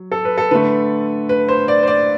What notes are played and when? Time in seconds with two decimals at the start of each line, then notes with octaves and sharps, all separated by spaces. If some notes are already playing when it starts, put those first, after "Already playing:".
Already playing: F#3
0.12 A4
0.25 B4
0.38 A4
0.51 D3 A3 B4
1.29 B4
1.49 C5
1.68 D5
1.83 C5
1.87 D5